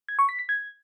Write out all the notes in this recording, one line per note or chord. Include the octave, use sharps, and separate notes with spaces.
G#6
C#6
B6
B6
G#6